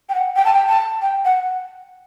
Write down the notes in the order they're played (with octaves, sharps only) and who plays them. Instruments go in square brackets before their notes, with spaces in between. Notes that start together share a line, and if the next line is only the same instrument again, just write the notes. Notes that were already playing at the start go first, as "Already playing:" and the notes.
[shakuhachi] G5
F#5
G5
A5
G5
A5
G5
F#5